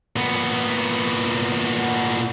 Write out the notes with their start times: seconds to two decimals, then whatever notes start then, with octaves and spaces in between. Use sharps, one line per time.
0.16 A#2 B3